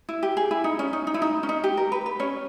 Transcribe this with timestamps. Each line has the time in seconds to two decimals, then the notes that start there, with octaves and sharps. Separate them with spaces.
0.09 E4
0.23 G4
0.37 G#4
0.51 E4
0.64 D#4
0.79 C#4
0.93 D#4
1.07 D#4
1.14 E4
1.22 D#4
1.43 C#4
1.49 D#4
1.64 G4
1.77 A#4
1.92 B4
2.06 B4
2.20 C#4 C#5